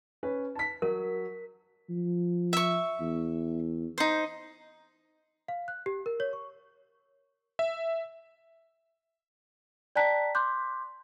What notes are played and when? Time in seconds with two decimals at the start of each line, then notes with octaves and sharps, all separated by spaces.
0.23 C#4 B4
0.55 A5 B6
0.82 F#3 A#4
1.89 F3
2.53 E5 C#6
3.00 E2
3.98 D#4 C5
5.48 F5
5.68 F#6
5.86 G4
6.06 A#4
6.20 C#5
6.33 C#6
7.59 E5
9.96 D5 G5 A5 A#5 F#6 B6
10.35 C6 D6 F#6 G6